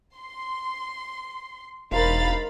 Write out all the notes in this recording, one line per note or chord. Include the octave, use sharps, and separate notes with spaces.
C6
E1 D#4 A#4 C5 F5 B5 A6